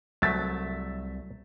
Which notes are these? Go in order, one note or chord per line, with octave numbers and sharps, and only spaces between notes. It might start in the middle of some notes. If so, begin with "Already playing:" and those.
C2 F#3 A3 E5 A6 B6